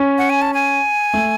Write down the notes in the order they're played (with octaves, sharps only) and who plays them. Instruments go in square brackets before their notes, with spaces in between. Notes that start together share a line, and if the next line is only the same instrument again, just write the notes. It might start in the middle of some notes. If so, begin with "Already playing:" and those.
Already playing: [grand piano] C#4
[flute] F#5
G#5
A5
G#5
[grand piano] A3